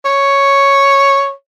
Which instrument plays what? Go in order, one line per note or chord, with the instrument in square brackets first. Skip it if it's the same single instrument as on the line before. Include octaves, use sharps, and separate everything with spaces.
[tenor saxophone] C#5